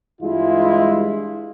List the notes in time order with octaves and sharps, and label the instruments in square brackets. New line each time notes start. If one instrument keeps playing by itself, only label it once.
[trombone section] G2 E3 G#3 E4 F4